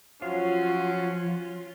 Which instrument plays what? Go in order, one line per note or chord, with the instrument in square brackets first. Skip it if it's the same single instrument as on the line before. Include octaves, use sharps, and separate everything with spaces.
[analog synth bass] F3 [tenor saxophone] F#3 [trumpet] C#4 [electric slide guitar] F4